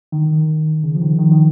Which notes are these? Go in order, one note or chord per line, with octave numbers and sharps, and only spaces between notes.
D#3
C#3
F3
D#3
D#3
D#3